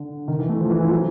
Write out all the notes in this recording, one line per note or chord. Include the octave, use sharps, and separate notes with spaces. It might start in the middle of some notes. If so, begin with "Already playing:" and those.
Already playing: D3
D#3
E3
A3
F3
E3
F3
F#3